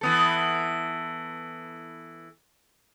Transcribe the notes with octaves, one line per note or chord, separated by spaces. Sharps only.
E3 B3 A4